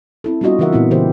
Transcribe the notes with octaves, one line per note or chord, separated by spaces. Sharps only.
C4 E4 A4
G3 B3 D4 F4 F#4 D#5
C#3 E3 D4 A#4 E5 F#5
A#2 B3 C4 E4
C#3 E3 G4 A#4 C5